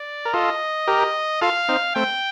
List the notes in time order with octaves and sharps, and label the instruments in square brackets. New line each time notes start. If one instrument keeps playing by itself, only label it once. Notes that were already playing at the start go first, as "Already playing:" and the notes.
Already playing: [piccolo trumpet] D5
[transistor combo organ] A#4
[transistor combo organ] F4 A4 [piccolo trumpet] D#5
[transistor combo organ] G4 A#4
[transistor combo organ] F4 A4 [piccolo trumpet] F5
[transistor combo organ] C4 D#4
[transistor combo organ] A3 C4 [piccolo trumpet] G5